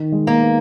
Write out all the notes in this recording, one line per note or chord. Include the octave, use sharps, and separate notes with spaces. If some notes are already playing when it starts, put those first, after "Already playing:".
Already playing: D#3
G#3
A#3
B3